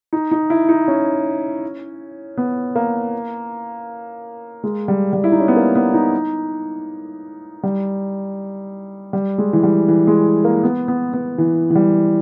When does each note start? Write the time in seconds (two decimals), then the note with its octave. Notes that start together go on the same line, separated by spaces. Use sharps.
0.13 D#4
0.31 D#4
0.50 E4
0.69 D#4
0.88 C#4
2.38 B3
2.76 A#3
4.64 G#3
4.88 G3
5.13 G3
5.24 E4
5.32 D#4
5.40 C#4
5.48 B3
5.56 A#3
5.75 B3
5.94 D#4
7.63 G3
9.13 G3
9.38 G#3
9.53 E3
9.63 G3
9.88 E3
10.07 G#3
10.44 A#3
10.63 B3
10.88 B3
11.13 B3
11.38 E3
11.70 E3
11.75 G3